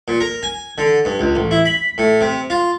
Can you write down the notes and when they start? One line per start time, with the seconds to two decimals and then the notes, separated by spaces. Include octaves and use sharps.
0.08 A#2
0.21 A#4
0.43 G#5
0.78 D3
1.05 G2
1.19 C#2
1.36 A1
1.51 E4
1.66 B5
1.98 A2
2.21 C3
2.50 F4